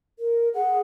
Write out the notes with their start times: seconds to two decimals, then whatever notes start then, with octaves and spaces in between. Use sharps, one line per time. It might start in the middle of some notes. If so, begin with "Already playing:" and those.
0.19 A#4
0.55 G#4 F#5